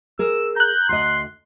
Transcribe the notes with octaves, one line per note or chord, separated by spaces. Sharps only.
G#4 A#4 E6
A#5 F#6 G6
D2 D#5 C6